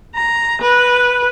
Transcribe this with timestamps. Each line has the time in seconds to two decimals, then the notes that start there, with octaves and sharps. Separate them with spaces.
0.16 A#5
0.62 B4